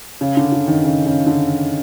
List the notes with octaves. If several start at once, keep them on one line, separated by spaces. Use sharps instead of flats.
C#3
D3
D3
D#3
C#3
C#3
D3